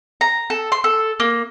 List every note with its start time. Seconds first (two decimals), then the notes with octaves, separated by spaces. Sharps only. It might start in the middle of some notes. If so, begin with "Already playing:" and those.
0.21 A#5
0.50 A4
0.72 C6
0.84 A4
1.20 A#3